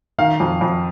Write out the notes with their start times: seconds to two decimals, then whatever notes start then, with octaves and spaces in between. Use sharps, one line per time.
0.18 D#3 F5
0.40 F2
0.61 F2